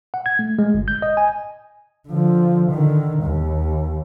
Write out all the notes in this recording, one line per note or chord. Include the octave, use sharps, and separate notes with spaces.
F#5
G#6
A3
G#3
G1
G6
D#5
G#5
D3 F3
D3 D#3
D#2